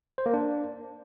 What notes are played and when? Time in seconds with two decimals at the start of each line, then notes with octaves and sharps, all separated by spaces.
0.18 C5
0.26 A#3
0.34 D4